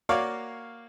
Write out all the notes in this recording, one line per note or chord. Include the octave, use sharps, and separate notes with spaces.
A#3 F#4 C#5 D5 F5